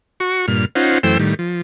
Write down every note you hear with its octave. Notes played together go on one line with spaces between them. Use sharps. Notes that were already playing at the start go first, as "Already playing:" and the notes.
F#4 C#6
G2 A#2 F6
C#4 D#4 F4 C5 F#5
F#2 E3 A3 C5 G5 E6
A2 D#3 G3
F3